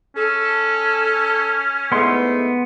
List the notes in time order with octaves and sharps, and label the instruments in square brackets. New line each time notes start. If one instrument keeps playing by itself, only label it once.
[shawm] C#4 [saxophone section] A4
[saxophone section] E2 G#2 A3 [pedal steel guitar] B3 C6